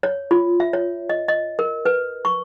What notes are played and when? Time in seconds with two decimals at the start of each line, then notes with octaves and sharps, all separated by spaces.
0.03 C#5
0.31 F4
0.60 E5
0.73 C#5
1.09 D#5
1.28 D#5
1.59 A#4
1.85 B4
2.25 C#6